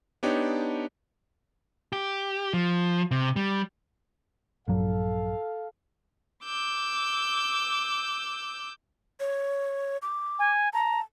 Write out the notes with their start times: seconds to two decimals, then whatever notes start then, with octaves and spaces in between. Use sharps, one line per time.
0.23 B3 D4 D#4 G4 C#5
1.93 G4
2.54 F3
3.11 C3
3.36 G3
4.68 A#1 G2 F#3 A4 F5
6.44 D6 E6 G6
9.20 C#5
10.02 D6
10.39 G#5
10.73 A5 A#5